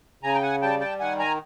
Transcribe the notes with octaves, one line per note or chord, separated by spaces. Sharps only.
C#3 G#5 A#5
G5
F#5 G#5
G3 G5 A5
G5 A5
D#3 F#5 G#5
G#5 A#5